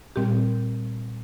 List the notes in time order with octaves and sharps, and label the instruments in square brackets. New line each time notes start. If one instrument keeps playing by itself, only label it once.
[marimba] A#2 G3 C4 G4